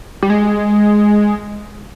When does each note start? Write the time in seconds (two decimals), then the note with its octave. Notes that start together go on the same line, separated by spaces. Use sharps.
0.22 G3
0.30 G#3